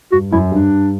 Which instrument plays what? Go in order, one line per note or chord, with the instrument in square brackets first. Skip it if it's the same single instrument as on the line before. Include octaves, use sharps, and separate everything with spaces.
[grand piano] G2 [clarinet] F#4
[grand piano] F#2 [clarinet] E4
[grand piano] G2 [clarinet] D4